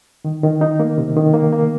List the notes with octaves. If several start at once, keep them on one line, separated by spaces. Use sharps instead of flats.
D#3
D#3
D#4
A#3
C3
D#3
A#3
A#3